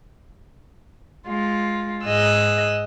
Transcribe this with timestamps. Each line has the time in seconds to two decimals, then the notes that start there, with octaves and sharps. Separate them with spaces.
1.26 G#3 F4
2.04 G#2 G#4 D#5 E6 F#6